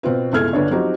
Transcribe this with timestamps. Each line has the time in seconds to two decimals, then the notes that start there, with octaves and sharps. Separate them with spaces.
0.03 B2 C4 F4 B4
0.32 G1 C#2 E4 A4 F6 G#6
0.53 G1 D3 B3 D4 C#5
0.71 F3 F#3 C4 D#4 F#4 G4